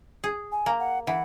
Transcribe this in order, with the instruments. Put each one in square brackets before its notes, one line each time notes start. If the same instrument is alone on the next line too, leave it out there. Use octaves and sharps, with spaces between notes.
[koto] G#4
[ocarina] G#5
[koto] A#3
[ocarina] F#5
[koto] E3 [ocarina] F#5